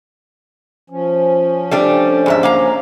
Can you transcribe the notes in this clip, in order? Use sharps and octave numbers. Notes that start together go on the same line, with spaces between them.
F3 C#4
G3 A3 D4
E2 G#2 E5
A#3 F5 A#5